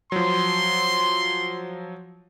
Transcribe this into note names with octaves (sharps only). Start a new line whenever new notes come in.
F3 F#3 C6